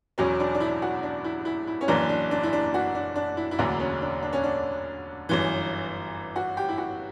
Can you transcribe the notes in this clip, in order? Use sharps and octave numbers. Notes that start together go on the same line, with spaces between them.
E1 E2 B2 F#3 C#4
D4
D4
E4
F#4
D4
E4
E4
E4
C#4
F#1 F#2 E3 A#3 D4
D4
D4
E4
D4
F#4
D4
D4
E4
E4
E1 D2 D3 F#3 A#3 D4
C#4
D4
D4
C#4
D4
G1 F#2 E3
F#4
G4
E4
F#4